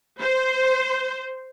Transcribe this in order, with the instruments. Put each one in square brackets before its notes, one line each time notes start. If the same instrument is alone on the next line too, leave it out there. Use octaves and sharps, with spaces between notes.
[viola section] C5